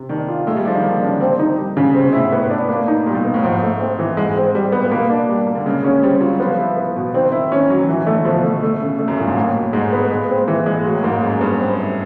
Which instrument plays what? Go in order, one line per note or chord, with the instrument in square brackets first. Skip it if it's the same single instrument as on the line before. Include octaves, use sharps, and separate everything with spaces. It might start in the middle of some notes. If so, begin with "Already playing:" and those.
Already playing: [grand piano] C3
[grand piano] D#3 [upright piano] D4
[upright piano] F4
[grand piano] G#3 [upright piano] A3
[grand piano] G3
[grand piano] F3 [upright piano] D4
[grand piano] D#3
[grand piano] D3 [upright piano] A#3
[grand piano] C#3 [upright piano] D4
[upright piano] C4
D#4
G3
C#3
[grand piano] C3 [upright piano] C4
[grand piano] B2
[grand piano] A2 [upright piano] E4
[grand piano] G#2
[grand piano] A2 [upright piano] B3
[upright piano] D4
A#3
D#4
[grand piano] A#2 [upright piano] G3
[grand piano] B2
[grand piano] A#2 [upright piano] B3
[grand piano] A2
[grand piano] G#2 [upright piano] F3
[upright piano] A3
C4
E3
[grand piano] G#2 [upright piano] G#3
[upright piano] C4
G3
B3
[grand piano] A#2
[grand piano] B2 [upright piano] A#3
[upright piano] D4
G3
A#3
[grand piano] D3
[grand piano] C#3 [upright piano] G#3
[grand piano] C#3 [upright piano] C#4
[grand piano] G3 [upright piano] C4
[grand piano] F#3 [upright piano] F4
[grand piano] F3 [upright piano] B3
[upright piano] E4
B3
B2
[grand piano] D#3 [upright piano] C4
[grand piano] D#3 [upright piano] E4
[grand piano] D#3 [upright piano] C#4
[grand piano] E3 [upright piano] F#3
[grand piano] D#3 [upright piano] E3
[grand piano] D3
[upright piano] A3
[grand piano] D3
[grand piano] B2 [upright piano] F3
[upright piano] A3
A3
C#3
A3
[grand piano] F#2
[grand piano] G2 [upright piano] A#2
[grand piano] G#2
[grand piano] A2 [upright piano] A#3
[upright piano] B2
[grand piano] G#2 [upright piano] G#3
[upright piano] B3
[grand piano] A#2 [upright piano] G#3
[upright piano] C4
E3
G#3
[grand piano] A#2
[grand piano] A2 [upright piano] F#3
[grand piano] G#2 [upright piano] A#3
[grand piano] F#2 [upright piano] G#3
[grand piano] G2 [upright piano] B3
[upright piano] C4
E4